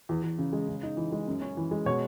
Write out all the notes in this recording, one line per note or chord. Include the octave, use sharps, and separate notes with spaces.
E2
E2
C#3
G#3
C#3
D#4
E3
G#3
F#2
C#4
E3
G#3
B2 C#5